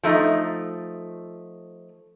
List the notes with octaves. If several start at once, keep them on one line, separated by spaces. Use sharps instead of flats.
F3 A3 D#4